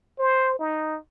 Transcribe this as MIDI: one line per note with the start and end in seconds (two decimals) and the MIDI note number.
0.19 0.56 72
0.59 0.98 63